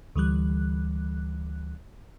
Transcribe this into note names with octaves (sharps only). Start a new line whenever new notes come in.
D2 E3 G3 F#6